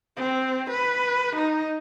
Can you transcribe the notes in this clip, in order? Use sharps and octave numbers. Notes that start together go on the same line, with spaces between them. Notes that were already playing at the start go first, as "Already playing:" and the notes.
C4
B4
D#4